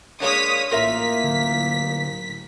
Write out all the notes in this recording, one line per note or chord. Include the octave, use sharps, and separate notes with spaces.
G#3 A#3 D4 C#5 D#6 B6
A1 A#3 F4 A#4 E5 B6
D3 F#3